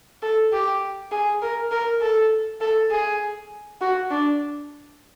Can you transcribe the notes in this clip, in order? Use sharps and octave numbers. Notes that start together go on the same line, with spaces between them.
A4
G4
G#4
A#4
A#4
A4
A4
G#4
F#4
D4